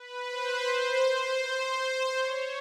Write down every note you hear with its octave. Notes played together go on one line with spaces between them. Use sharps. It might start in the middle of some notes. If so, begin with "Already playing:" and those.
Already playing: B4
C5
C5
C#5